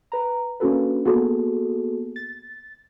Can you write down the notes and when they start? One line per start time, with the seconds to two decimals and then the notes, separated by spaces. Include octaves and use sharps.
0.12 B4 A#5
0.60 A#3 C#4 D4 F#4 A4 B4
1.05 A#3 B3 F#4 G#4 A4
2.16 A6